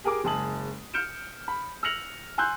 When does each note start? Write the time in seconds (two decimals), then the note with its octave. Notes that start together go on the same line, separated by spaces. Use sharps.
0.04 G4 G#4 A#4 G#5 D6
0.24 F#1 G#3 G#4 A5 D#6 F#7
0.94 F6 G6 C#7 D7 E7
1.48 B5
1.83 E6 F6 A#6 C#7 F7 F#7
2.38 G#5 C6 E6 F#6 G6